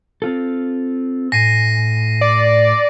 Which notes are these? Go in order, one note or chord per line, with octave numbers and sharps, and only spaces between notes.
C4 F4 A4
A2 G#5 A#6 C7 D#7
D5